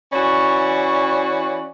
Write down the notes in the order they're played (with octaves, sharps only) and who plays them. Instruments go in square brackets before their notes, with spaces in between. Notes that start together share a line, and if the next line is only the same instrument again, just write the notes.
[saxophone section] E3 C#4 F#4 D5